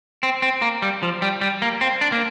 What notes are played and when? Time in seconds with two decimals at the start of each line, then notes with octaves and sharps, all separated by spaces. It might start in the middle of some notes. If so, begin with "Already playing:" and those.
0.23 C4
0.42 C4
0.62 A#3
0.82 G3
1.03 F3
1.22 G3
1.41 G3
1.62 A#3
1.81 C4
2.01 D4
2.12 A#3